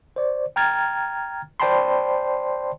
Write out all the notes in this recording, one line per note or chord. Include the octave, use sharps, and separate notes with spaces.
C5 D5
G5 A#5 F6 G#6 A6
C5 D5 G5 A5 B5 C6